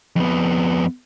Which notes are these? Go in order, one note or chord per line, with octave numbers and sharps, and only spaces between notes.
F2 B3